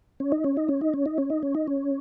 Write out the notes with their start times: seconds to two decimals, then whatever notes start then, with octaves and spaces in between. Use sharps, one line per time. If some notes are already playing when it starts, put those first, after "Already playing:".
0.20 C#4
0.32 D#4
0.44 C#4
0.57 D#4
0.68 C#4
0.81 D#4
0.94 C#4
1.06 D#4
1.18 C#4
1.30 D#4
1.43 C#4
1.55 D#4
1.67 C#4